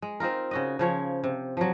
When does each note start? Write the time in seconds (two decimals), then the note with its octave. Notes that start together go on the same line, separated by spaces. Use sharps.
0.02 G#3
0.20 C4 D#4 F4 A#4
0.51 C#3 F#4 D#5
0.79 C#3 F3 C#5
1.24 C3
1.57 F3 F#3